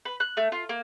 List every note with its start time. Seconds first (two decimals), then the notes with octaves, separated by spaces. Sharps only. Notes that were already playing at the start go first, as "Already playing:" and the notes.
0.05 B4
0.20 F#6
0.37 A3
0.52 F4
0.69 A#3